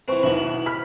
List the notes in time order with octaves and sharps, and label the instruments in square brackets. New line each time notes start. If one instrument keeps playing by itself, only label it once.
[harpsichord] E3 C4 [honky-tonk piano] B4 C#6
[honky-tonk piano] B1 E2 D#3 [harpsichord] B3 E4 B5
[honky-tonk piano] B5 F6 B6